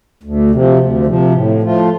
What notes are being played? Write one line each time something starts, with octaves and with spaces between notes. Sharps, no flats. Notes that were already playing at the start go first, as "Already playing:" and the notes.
D2
C3 F3
D2
C3 F3
A2
F3 A3 F4